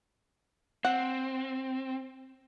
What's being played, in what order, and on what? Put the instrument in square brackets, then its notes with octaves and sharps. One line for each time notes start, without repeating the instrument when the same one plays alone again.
[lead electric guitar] C4 [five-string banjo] F#5